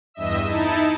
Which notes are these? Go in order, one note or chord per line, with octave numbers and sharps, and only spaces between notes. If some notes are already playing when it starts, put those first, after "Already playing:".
E2 G2 D#5 E5 E6
D#4 E4 A5